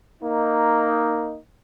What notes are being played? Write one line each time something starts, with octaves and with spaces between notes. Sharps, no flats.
A#3 D#4